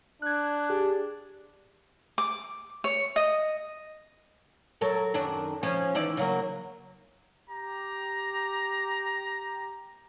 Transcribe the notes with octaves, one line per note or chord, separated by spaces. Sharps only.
D4 F#6 G#6
G4 G#4
D6
C#5
D#5
F#3 A4 A#4
F#2 D#3 D4
F3 C#4
D#3 E3 D5
C#3 F#3 A#3
G4 A#5